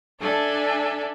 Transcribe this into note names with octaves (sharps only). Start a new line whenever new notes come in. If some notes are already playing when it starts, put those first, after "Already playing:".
D4 A4 E5 G#5